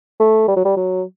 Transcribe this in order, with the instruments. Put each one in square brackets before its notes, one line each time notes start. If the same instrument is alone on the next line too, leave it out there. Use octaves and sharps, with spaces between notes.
[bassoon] A3
G3
F#3
G3
F#3